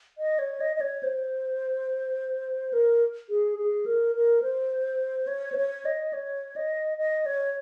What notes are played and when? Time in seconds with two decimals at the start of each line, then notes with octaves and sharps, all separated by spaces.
0.18 D#5
0.39 C#5
0.60 D#5
0.76 D#5
0.81 C#5
1.03 C5
2.73 A#4
3.30 G#4
3.58 G#4
3.86 A#4
4.15 A#4
4.42 C5
5.27 C#5
5.52 C5
5.57 C#5
5.85 D#5
6.13 C#5
6.56 D#5
6.98 D#5
7.26 C#5